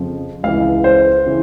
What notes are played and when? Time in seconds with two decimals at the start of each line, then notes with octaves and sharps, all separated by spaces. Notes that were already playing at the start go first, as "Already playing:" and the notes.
Already playing: F2 C#3 F3
0.43 C#2 C#3 E3 F5
0.84 C5
1.26 C#3 E3